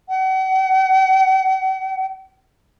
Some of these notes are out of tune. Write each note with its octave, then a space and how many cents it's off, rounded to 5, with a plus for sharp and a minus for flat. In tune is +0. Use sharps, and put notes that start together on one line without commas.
F#5 +45